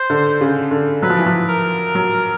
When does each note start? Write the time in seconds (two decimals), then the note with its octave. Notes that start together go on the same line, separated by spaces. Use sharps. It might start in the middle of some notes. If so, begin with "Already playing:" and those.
Already playing: C5
0.10 D3
0.41 C#3
0.71 D3
1.02 F#3 B4
1.10 F3
1.18 E3
1.26 F3
1.49 A#4
1.95 F#3